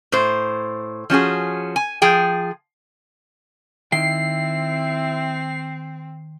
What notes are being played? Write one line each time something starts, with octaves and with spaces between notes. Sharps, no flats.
A2 C5
F3 C#4 F#4 G#4
G#5
F3 G#4 G5
D#3 C4 E4 G5 C7